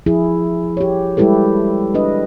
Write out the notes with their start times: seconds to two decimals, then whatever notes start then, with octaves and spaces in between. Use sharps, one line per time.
0.06 F3 E4 G#4
0.77 G4 C#5
1.17 G3 G#3 E4 G4 A4 B4
1.94 D4 B4 D#5